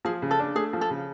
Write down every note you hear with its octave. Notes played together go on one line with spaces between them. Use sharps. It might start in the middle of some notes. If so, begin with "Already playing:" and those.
F3 G#4
C#3
A4
D4
A3 G#4
F3
A4
C#3